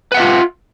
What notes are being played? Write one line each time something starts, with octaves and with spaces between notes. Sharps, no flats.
F4 B4 E5 F#5